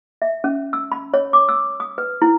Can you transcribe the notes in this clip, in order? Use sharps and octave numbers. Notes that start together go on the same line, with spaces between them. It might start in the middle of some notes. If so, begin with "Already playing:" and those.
E5
C#4
E6
B5
C#5
D6
E6
D#6
B4
E4